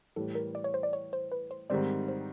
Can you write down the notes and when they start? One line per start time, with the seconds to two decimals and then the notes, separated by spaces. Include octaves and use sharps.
0.16 A2 E3 G3 A4
0.35 A#4
0.55 D5
0.64 C#5
0.74 C5
0.83 D5
0.93 C#5
1.13 C5
1.32 B4
1.51 C5
1.70 G#2 D#3 G3 C4 D5
2.08 C5